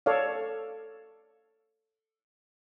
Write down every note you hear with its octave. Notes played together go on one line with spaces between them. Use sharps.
A4 C#5 D5 F5